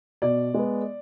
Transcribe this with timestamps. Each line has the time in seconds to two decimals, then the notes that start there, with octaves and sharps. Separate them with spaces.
0.22 B2 D5
0.54 G#3 B3